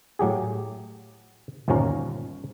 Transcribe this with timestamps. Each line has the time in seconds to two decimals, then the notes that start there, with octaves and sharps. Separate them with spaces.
0.19 A2 F#3 G4 G#4
1.68 G1 D#2 A#2 F3 C#4 A#4